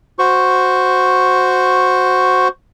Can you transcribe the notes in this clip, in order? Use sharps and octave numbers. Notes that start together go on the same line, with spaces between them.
F#4 C5 C#6